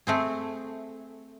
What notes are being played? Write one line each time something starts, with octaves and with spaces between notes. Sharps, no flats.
A3 C4 G#4